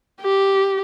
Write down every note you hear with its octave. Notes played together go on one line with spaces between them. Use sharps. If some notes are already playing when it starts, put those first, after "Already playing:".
G4